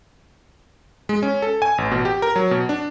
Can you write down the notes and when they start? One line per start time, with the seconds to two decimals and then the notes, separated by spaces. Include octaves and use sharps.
1.09 G#3
1.23 C#4
1.42 A4
1.62 G#5
1.78 A1
1.91 B2
2.05 G4
2.22 A#4
2.36 F#3
2.51 B2
2.69 D4